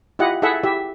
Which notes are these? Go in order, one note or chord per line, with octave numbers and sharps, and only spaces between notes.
E4 F4 G4 D#5 F#5
E4 G#4 A4 E5 F#5
E4 G4 E5